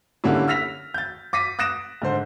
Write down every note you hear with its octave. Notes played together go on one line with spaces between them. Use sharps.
D3 G3 A#3 C#4 E4
E6 F6 A#6 B6 F7
G6 A6
D6 A#6 B6 D#7
D#6 F#6 A#6 D7 E7
G#2 D3 C5